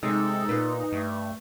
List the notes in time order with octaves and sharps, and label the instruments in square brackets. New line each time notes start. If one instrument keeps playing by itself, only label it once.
[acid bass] C3 [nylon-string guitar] G#3 [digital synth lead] D#4 [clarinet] A4
[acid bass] A#2 [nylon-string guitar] B4
[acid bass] G2 [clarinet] A3